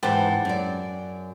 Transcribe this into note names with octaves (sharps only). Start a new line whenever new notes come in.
G#2 C#3 E3 G4 C5 F#5 A5
F#2 D5